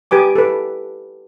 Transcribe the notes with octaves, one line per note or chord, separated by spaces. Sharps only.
G4 B4 G#5 D6
A4 B4